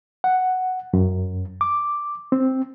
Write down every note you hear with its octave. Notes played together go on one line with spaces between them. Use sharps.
F#5
F#2
D6
C4